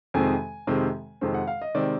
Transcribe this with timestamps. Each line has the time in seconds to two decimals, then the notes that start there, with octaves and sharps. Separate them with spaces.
0.14 F2 C3 D#3 G#3 C4 G#5
0.67 F2 C3 D#3 G#3 C4
1.21 F2 C3 D#3 G#3 C4
1.34 F#5
1.47 F5
1.62 D#5
1.75 C3 D#3 G#3 C4 D5